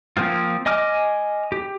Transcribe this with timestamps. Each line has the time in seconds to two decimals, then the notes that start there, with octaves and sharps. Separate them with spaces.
0.17 F3 A#3 C4 F4
0.66 D#5 G#5 D6 F6
1.52 G4